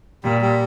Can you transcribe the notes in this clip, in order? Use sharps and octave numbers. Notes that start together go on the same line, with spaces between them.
A#2 G3
G3